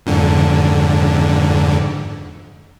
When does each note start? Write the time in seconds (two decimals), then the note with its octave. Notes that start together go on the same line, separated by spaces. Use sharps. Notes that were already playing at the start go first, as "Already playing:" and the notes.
0.06 F2 G#2 D3